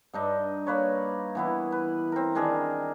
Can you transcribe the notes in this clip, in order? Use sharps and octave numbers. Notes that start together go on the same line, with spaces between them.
G2 D4 D#4
A#3 B4 C#5
E3 B3 E4
B4
C4 A#4
D#3 D4 G#4 A#4